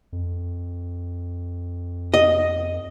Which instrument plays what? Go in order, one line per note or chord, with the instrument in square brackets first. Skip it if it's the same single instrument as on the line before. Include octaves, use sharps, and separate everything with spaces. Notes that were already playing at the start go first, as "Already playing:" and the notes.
[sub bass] F2
[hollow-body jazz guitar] D#5